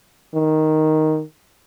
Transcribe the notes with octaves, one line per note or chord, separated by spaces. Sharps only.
D#3